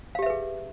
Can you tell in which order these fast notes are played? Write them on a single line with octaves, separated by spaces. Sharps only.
F5 G4 E5 B4 G#4